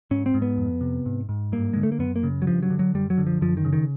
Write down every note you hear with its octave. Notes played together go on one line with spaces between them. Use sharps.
G#2 C#4
C4
G#2
B3
F2
C3
G#2
G#2
G2 A#3
D3 G#3
A3
A#3
F#2 B3
A#3
C#3
F#3
G2 F3
F#3
D3
F#3
F#2 G3
F#3
D3
F3
F#2 F3
D#3
C#3
D#3